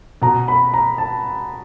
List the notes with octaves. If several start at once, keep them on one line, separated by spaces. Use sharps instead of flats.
B2 A#5
B5
A#5
A5